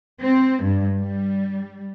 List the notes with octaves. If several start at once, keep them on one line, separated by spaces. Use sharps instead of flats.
C4
G2
G3